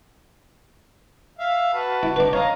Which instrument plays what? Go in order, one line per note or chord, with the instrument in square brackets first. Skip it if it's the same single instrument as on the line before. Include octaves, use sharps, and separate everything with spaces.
[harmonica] E5 F5
F#4 B4 A5
[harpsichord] E4
[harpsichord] D4 B4 [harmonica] D#4
[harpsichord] C#5 [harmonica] D#5 F5 A#5